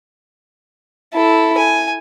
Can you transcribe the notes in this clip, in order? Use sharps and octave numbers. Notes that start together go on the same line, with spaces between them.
E4 A4
G#5